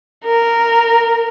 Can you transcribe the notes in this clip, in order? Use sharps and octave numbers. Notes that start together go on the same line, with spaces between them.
A#4